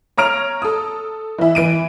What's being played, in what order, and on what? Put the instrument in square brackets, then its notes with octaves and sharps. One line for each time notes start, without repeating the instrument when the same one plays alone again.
[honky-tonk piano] C#5 A#5 F6 D7 F7
A4 D#6
E3 E4
E3 D7 D#7